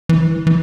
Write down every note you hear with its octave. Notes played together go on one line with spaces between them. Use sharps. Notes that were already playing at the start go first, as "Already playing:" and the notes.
E3
E3